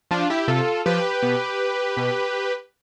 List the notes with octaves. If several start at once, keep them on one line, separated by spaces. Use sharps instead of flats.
F3 D4 F4
E4 G4
C3 F4 A4
F3 G4 B4
B2
B2